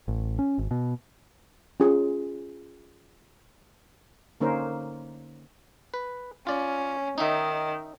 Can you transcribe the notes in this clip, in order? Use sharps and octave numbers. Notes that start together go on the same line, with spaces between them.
A1
C#4
G#1
B2
C#4 F4 G#4
D3 A#3 C#4 D#4 A#4 C5
B4
C#4 F4 D5
D#3 D#4 E5